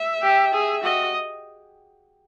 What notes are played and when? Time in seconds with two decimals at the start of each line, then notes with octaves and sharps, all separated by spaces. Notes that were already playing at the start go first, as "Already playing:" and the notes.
Already playing: E5
0.23 G4
0.54 G#4
0.83 F#4 D#5